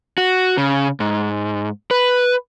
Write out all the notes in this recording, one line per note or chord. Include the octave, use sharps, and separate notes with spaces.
F#4
C#3
G#2
B4